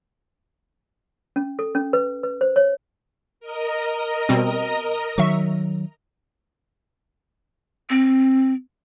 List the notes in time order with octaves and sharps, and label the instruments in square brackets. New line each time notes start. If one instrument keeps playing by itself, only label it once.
[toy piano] C#4
A4
C#4
B4
B4
C5
C#5
[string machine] A#4 D#5 A#5
[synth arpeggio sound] B2 G3 C4
[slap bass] D#3 F#3 [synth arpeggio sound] E5 C#6
[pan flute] C4